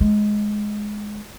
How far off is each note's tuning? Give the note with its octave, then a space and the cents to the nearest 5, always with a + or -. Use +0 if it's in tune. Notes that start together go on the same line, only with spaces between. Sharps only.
G#3 +10